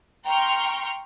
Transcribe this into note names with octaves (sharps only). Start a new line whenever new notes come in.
G5 A#5 C6 C#6 F6